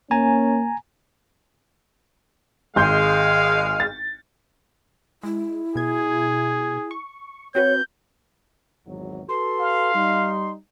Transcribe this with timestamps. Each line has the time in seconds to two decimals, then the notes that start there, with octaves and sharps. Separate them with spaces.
0.11 A#3 C#4 G#5 A#5
2.76 G#1 G#3 F5 C6 G6
3.80 A6
5.23 G#3 E4
5.75 B2 G#4 G#6
6.91 C#6
7.55 C4 F#4 B4 C#5 G6
8.87 G#1 E2 F#3
9.28 F#4 A4 B4 C6
9.59 F5
9.94 G3 D#4